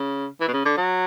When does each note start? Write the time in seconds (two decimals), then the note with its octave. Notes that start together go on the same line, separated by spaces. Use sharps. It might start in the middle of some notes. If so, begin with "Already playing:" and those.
Already playing: C#3
0.40 E3
0.48 B2
0.53 C#3
0.65 D3
0.77 F#3